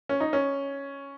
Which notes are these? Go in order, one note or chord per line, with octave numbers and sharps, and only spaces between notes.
C#4
D#4
C#4